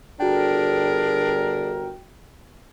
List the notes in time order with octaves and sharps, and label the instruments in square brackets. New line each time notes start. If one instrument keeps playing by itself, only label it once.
[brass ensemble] G1 A#4 [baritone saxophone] D4 [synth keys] F#4 G5 [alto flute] G#4